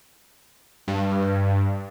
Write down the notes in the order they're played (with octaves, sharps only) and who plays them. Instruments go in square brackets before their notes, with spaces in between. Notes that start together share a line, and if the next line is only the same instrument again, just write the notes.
[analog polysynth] G2